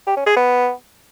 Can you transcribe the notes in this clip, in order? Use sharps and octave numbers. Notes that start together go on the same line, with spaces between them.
G4
C#4
G#4
B3